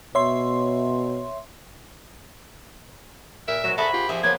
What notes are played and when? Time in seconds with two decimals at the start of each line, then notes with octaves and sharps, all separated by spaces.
0.15 B2 C#5 E5 C6
3.48 A#2 A#4 E5
3.64 C3 F#3 F#4 A#4 E7
3.78 F#4 G#4 A4 E5 B5
3.93 F4 G4
4.09 F3 C4 G#4 E5
4.23 C#3 F#3 A#3 B3 G#6